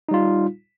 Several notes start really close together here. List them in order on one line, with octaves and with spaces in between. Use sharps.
D#4 G3 F4